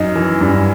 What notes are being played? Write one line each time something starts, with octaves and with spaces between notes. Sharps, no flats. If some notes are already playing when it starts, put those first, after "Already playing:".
Already playing: F#2 D#4
E3
G2